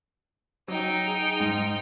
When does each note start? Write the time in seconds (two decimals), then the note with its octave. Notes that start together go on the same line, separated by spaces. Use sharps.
0.68 F#3 D#4 G5
1.07 G#4
1.40 G#2